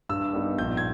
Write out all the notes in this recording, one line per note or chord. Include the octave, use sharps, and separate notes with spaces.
G2 E6
G3 B3 D#4
A#1 G6
G#6